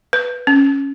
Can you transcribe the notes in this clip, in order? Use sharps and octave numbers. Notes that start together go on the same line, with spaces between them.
B4
C#4